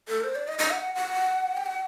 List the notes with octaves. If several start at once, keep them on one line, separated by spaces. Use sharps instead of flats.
A4
A#4
C5
D5
D#5
D#5
F#5
F#5
G5
F#5